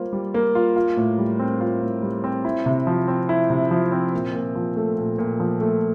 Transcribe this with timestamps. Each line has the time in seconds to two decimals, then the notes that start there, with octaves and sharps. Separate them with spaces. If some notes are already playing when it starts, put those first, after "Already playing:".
Already playing: G3 A#3 F4 C5
0.13 G3
0.34 A#3
0.55 F4
0.76 F4
0.97 A2
1.18 G3
1.40 C4
1.61 F4
1.82 A2
2.02 G3
2.24 C4
2.45 E4
2.66 C3
2.87 F3
3.08 C4
3.29 E4
3.50 C3
3.71 F3
3.92 C4
4.13 A#2
4.34 A#2
4.55 F3
4.76 A3
4.97 A#2
5.18 A#2
5.40 F3
5.61 A3